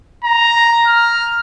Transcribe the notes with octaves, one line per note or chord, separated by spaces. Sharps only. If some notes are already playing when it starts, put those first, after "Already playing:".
A#5
F6